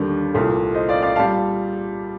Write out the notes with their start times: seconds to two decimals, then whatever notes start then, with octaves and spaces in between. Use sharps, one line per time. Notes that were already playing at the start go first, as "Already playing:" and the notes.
Already playing: D#2 D3 G3 A#3 D4
0.34 C2 A#2 A3
0.75 C5 D#5
0.88 D5 F5
1.02 D5 F5
1.16 A#2 G3 F5 A5